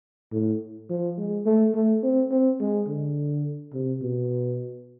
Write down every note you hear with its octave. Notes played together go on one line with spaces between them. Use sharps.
A2
F3
G#3
A3
A3
C4
C4
G#3
D3
C3
B2